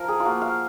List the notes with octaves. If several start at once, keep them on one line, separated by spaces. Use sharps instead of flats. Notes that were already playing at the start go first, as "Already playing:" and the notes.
Already playing: F3 A#4
G#4
F4
A#3 F#4
F5